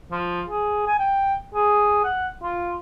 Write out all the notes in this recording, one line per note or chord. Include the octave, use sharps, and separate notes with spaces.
F3
G#4
G#5
G5
G#4
F#5
F4